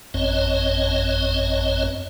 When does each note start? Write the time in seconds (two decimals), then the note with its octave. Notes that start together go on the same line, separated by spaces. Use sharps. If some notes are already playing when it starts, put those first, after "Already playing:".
0.14 A1 F#2 C4 C#5 D#5